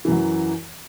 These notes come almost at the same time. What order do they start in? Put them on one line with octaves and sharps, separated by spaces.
E3 F#2 F#3